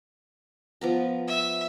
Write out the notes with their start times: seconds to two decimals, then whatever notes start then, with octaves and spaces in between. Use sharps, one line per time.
0.81 F3 B3 A#5
1.28 E5